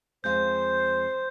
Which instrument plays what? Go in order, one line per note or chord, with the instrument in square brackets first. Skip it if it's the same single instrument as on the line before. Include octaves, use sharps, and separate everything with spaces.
[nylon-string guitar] F2 G#3 F5 [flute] C5 [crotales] G6